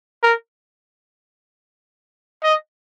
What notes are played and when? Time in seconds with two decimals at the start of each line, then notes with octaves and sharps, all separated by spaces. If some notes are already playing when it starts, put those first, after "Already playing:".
0.23 A#4
2.43 D#5